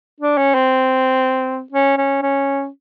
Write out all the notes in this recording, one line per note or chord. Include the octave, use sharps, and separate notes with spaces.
D4
C#4
C4
C#4
C#4
C#4